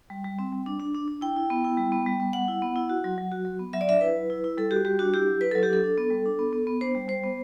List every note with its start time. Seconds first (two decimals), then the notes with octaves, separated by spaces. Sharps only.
0.10 G3
0.24 G3
0.39 C4
0.53 G3
0.66 D4
0.80 D4
0.95 D4
1.08 D4
1.21 E4 G5
1.36 E4
1.50 B3
1.64 E4
1.78 G3
1.92 B3
2.06 G3
2.20 B3
2.33 G3 F#5
2.48 E4
2.62 B3
2.76 E4
2.90 F#4
3.04 F#3
3.18 F#3
3.32 F#4
3.45 F#3
3.59 B3
3.73 F#3 E5
3.81 D5
3.88 D4 E5
4.01 E4 B4
4.16 F#3
4.30 E4
4.44 E4
4.58 G3 A4
4.71 F#4 G4
4.85 G3 G4
4.99 D4 F#4
5.14 E4 G4
5.27 F#3
5.41 E4 B4
5.51 F#3 A4
5.63 G4
5.70 D4 A4
5.84 D4
5.98 B3
6.11 G3
6.26 D4
6.39 B3
6.53 B3
6.67 B3
6.81 D4 C5
6.95 G3
7.08 G3 C5
7.24 B3